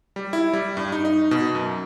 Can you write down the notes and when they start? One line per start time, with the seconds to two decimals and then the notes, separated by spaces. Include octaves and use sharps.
0.16 G3
0.33 E4
0.53 G3
0.77 G2
0.92 D#4
1.05 D#4
1.31 B2
1.55 F#2